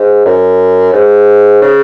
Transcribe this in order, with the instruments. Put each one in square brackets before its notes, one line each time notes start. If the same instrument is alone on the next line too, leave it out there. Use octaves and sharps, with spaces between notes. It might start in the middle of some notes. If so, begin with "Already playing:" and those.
Already playing: [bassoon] G#2
F#2
G#2
C#3